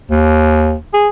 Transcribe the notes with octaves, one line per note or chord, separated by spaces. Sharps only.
D#2
G#4